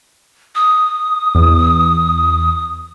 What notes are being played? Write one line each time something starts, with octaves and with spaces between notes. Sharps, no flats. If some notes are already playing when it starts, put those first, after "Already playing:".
D#6
E2